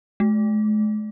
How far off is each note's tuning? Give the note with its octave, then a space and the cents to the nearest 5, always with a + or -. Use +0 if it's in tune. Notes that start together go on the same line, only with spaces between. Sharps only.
G#3 +45